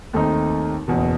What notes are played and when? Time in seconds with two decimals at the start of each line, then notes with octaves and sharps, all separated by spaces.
0.13 D#2 D#3 A3 C4 D#4
0.88 F#1 E2 B2